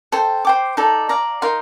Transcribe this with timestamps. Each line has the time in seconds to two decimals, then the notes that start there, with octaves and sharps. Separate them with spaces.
0.12 A4 C5 G5
0.45 C5 G5 D6
0.77 D#4 A4 D5
1.09 D5 F5 A#5
1.42 D#4 A#4 F5 C6